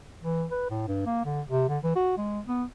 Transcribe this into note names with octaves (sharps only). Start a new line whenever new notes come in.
E3
B4
A2
G2
A#3
D3
C3
D3
E3
F#4
G#3
B3